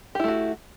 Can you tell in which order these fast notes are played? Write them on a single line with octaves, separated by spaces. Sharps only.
G4 E4 A3 F#4